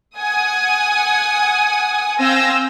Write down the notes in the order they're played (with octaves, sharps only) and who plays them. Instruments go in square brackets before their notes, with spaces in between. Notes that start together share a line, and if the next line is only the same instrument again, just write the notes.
[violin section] F#5 G#5 D#6
C4 F5 G#5 E6 G6 A#6